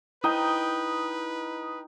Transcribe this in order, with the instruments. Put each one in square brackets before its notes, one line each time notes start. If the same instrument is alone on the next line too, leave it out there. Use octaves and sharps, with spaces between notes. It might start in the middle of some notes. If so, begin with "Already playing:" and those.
[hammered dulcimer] D#4 G5 [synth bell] E4 [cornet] B4 [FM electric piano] D#6